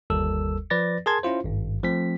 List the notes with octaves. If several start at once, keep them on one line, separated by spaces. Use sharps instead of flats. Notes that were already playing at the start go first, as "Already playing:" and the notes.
G1 D#2 G3 A4 A#4 E6
F3 B4 D5 A6 A#6
G#4 A#4 A5 C6 G#6
C#4 E4 F4 C5
G#1 G2
F3 A3 C4 B6